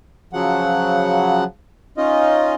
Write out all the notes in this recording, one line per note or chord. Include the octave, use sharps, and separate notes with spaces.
C#3 F3 F#3 F#5
C#4 D#4 F4 D#5